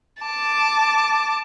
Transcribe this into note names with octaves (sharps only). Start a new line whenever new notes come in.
A5 D6